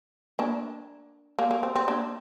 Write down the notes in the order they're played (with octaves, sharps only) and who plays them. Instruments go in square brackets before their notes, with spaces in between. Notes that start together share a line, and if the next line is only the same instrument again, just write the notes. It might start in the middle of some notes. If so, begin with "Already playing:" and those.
[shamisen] A#3 D4
A#3
A#3
C4
C4
A#3 D4